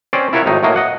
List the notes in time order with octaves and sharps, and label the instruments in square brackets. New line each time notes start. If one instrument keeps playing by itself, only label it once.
[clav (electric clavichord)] C4 C#4 C5 D5
E4 F4 A#4 C#5 E5 F#5
G#1 A2 D#4
A2 F#3 A#3 D#5
D#5 F#5